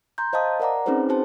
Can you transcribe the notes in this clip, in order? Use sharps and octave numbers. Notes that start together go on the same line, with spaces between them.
A#5 C6 G6
C5 D#5 F5 A5 D#6
A#4 D5 F#5 A#5 D6
C4 C#4 D#4 G#4 B4 C5
F#4 G#4 C5 A5